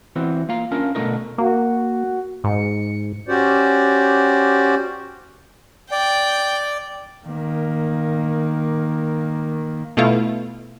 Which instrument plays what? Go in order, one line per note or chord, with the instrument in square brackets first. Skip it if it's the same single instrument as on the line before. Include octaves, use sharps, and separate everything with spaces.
[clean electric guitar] E2 E3 C4 F#4
A#3 F4 F5 A#5
C#4 D4 F4 A#4
B2 D3 G#3 A3 D#4 A#4
[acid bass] A#3 [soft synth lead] F#4
[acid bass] G#2 [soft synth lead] C#7
[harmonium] C#4 F#4 G4 C5 D5
[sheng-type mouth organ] D5 [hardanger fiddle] G5
[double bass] D#3 A#3
[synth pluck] B2 A3 E4 F4